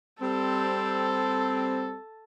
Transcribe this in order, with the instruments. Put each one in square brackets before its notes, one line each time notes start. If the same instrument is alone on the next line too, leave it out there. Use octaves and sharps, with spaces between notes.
[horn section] G3 C4 [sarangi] A4